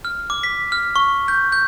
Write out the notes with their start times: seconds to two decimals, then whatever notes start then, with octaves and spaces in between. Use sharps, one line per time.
0.05 F6
0.30 D6
0.43 B6
0.72 F6
0.96 C#6
1.28 G6
1.52 G6